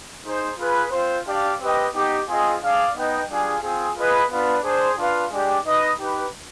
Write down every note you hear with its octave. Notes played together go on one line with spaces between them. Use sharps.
D#4 G#4 C5
F4 G#4 B4
C4 F4 C5
D4 G4 D5 F5
C4 G4 B4 D#5 G5
B3 D#4 G4
C4 F4 G#4 C5 D#5
D4 G#4 D5 F5
B3 D#4 B4 D#5 G5
G3 D4 F4 G#4
C4 F4 G#4
F4 G#4 B4 D#5
B3 D4 F4 B4
D4 G#4 C5
D4 F4 B4 F5
G#3 D4 G4 D5 G5
D#4 B4 D#5
D#4 G4 B4